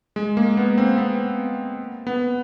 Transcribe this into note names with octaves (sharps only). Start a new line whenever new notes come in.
G#3
A#3
B3
C4
B3
B3